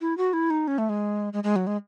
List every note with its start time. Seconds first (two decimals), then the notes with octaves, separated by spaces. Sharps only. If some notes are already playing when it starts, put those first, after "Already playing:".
0.01 E4
0.18 F#4
0.33 E4
0.50 D#4
0.68 C#4
0.78 A3
0.89 G#3
1.33 G#3
1.44 G#3
1.56 F#3
1.67 G#3